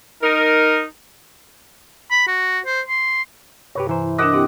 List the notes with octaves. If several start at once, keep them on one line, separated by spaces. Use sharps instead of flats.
D#4 A#4
B5
F#4
C5
C6
G2 C3 G4 B4 C#5
E3 C5 G#5 A#5
E4
D4 A#4 D#5 F#5 D6
C4 E4 G4